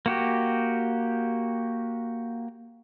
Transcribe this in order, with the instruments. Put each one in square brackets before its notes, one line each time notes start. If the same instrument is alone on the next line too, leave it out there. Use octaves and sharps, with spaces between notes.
[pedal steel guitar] A#3 F#4 G4